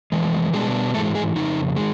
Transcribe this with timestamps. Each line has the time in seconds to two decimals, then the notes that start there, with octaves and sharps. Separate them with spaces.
0.12 F2 C#3 E3 G#3
0.53 B2 G3 G#3 B3 D4 G#4
0.94 G#2 E3 G#3 A3 A4
1.15 G#3 G#4
1.35 F2 C#3 D#4
1.77 D#3 G#3